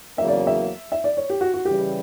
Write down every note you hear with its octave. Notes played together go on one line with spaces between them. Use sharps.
E2 C#3 F#3 A#3 E5
D5
E5
E5
D5
C#5
G4
F#4
F#4
C#3 E3 G3 G4